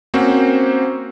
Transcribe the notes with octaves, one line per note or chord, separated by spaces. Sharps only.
A#3 C4 C#4 F#4 C5